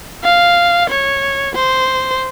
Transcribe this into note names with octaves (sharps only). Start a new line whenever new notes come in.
F5
C#5
C5